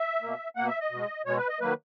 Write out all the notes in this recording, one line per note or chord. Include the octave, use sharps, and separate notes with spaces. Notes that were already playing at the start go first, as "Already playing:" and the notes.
Already playing: E5
B2 A#3
B2 A#3 F#5
E5
D#5
B2 G#3
B2 G#3 C#5
B4
D#5
D#3 F#3 A#3 B4